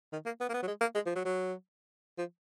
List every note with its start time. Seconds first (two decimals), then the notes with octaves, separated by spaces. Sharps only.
0.12 D#3
0.26 A#3
0.40 B3
0.49 A#3
0.54 B3
0.63 F#3
0.67 G#3
0.81 A#3
0.95 G#3
1.05 F3
1.15 F#3
1.25 F#3
2.17 F3